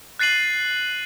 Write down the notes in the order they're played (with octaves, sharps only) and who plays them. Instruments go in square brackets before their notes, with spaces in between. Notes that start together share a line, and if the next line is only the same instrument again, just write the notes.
[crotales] F#6 A6 C7 D#7 F#7